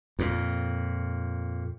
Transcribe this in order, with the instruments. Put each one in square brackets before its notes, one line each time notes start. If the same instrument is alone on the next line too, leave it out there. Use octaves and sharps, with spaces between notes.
[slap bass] F2 A#2